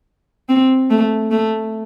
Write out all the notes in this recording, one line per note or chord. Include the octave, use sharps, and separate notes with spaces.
C4
A3
A3